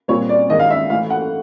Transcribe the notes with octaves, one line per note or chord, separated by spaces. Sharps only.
A#2 G3 C4 C#5
D5
G#2 D#3 G#3 D#5
F5
E5
A2 E3 A3 F5
F#5